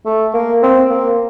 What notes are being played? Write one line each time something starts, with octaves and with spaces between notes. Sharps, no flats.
A3
A#3
C4
A#3